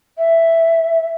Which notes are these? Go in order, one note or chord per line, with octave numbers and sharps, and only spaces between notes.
E5